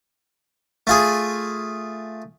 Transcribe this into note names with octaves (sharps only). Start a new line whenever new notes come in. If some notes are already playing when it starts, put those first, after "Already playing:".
A3 F4 G#4